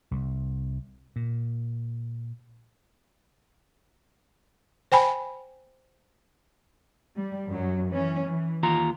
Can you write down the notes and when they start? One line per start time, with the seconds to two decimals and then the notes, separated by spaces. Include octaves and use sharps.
0.11 C2
1.16 A#2
4.92 C5 G5 G#5 B5
7.17 G3
7.49 F#2 F#3
7.89 E3 C#4
8.25 E3
8.63 D#2 F4 A#5